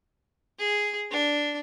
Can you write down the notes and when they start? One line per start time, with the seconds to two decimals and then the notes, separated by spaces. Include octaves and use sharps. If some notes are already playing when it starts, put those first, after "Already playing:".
0.59 G#4
1.11 D4